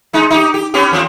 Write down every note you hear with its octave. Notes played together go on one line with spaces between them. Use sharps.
G#3 D#4
D#4 G4
G4
B3 C#4 G4
D#2 F3 C4